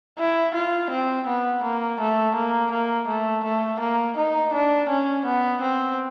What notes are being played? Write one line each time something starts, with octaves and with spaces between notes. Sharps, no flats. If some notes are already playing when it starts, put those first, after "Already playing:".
E4
F4
C4
B3
A#3
A3
A#3
A#3
A3
A3
A#3
D#4
D4
C#4
B3
C4